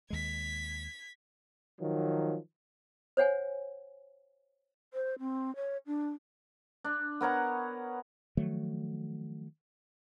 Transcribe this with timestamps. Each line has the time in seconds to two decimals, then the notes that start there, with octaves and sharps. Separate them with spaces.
0.10 D#2 G#3 G#6 B6
1.80 D#3 F3 F#3
3.17 C5 C#5 F#5 G#5
4.94 C5
5.19 C4
5.56 C#5
5.86 D4
6.84 D4
7.21 B3 A#4 C#5 F#5
8.37 D#3 F3 F#3 A3